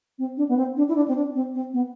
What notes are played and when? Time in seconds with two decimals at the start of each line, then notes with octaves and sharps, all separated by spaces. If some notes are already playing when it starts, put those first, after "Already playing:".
0.19 C4
0.37 D4
0.49 B3
0.57 C4
0.77 D4
0.89 E4
0.96 D4
1.08 C4
1.16 D4
1.35 C4
1.54 C4
1.74 B3